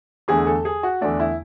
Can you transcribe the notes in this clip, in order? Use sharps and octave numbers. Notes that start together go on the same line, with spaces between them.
E2 D3 A3 G#4
A4
G#4
F#4
E2 D3 A3 D4
E4